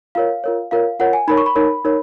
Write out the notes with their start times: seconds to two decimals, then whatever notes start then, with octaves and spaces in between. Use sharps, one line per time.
0.15 F4 A#4 C#5 F5
0.44 F4 A#4 C#5
0.71 F4 A#4 C#5 F5
0.99 F4 A#4 C#5 F#5
1.13 G#5
1.28 D#4 A#4 C#5 B5
1.37 C#6
1.46 B5
1.56 D#4 A#4 C#5
1.85 D#4 A#4 C#5